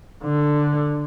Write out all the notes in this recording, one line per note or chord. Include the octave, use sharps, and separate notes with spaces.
D3